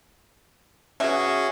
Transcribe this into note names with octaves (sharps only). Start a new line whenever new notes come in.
B2 C#4 F#4 G#4 E5